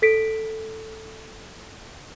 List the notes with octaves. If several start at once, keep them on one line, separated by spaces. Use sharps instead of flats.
A4 B6 D7